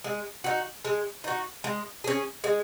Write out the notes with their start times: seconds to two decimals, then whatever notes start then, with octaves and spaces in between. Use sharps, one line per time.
0.04 G#3
0.44 D#4 F#4
0.85 G#3
1.24 D#4 F#4
1.64 G#3
2.04 C#4 G#4
2.44 G#3